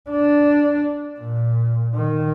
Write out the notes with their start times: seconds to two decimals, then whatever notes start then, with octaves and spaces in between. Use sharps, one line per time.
0.10 D4
1.20 A#2
1.95 D#3